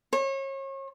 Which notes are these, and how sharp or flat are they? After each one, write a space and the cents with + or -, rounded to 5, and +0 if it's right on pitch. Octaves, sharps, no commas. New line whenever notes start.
C#5 -35